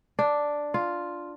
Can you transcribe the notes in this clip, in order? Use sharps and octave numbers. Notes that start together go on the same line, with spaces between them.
D4
F4